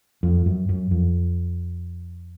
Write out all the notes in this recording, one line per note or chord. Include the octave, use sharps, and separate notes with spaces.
F2
F#2
F#2
F2